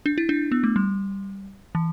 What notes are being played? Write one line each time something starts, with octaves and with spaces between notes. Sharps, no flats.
D4
E4
D4
B3
A3
G3
E3